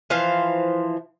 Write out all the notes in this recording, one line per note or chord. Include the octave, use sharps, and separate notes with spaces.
E3 F3 C5 F5